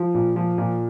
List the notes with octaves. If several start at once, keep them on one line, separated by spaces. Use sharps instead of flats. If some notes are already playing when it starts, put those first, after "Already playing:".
Already playing: F3
A#2
F3
A#2